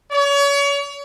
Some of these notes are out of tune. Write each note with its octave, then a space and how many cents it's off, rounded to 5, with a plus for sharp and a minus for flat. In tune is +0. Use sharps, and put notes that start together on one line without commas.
C#5 +35